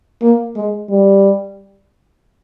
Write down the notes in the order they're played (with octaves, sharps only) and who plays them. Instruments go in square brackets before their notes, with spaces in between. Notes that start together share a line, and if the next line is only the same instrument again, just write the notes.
[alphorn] A#3
G#3
G3